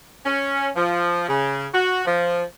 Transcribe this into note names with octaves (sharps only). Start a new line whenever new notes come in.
C#4
F3
C#3
F#4
F3